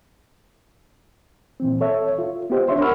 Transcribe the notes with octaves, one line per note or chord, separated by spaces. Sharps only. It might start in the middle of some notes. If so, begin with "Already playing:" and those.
A#2 E3 C4
A4 C#5 E5
F4
B3 F4 G4 C5 D#5
D4 C#5 E5 C6
A#4 F#5 B5 C#6 E6 F6